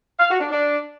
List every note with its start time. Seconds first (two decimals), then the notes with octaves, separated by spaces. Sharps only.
0.19 F5
0.30 F#4
0.40 D4
0.50 D4